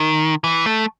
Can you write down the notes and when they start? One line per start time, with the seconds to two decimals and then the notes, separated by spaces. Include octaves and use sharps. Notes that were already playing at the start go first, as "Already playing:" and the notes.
Already playing: D#3
0.44 E3
0.66 A3